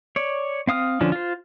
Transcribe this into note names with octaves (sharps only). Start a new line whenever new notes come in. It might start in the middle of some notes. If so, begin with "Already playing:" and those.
C#5 D5
C4 F5 D#6 F6
D3 F3 C#4 D4 F4
F4 C5